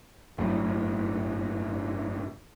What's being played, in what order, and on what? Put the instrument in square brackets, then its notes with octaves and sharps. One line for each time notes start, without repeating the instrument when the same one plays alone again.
[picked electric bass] G1 F#2 A2